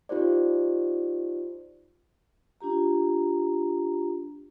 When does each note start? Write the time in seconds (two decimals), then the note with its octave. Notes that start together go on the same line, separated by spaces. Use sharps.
0.09 D#4 F4 G4 C5 D5
2.61 D4 F4 G4 A#5